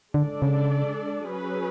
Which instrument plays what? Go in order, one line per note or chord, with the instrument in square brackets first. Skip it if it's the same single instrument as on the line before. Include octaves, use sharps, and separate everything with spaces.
[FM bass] D3 [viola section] G#3 D4 A4 D5
[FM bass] C#3
[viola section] F#3 C#4 G#4 B4